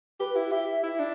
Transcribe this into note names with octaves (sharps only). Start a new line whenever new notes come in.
G4 B4
E4
G4 E5
E4
D4